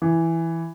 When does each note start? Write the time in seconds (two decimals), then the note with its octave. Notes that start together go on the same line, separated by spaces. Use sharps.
0.02 E3